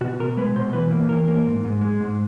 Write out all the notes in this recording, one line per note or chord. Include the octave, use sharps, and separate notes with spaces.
B2 F#4
B2 A#4
G#3 B4
B2 C5
E3 B4
A#3
E3 A#4
A#3
G#2
G#2
G#3
G#2